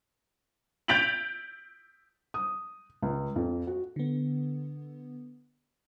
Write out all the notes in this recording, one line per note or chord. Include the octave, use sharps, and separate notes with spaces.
G6 A6 B6 D7 F7 F#7
D#6
C#2
F2
F#4
D3 B3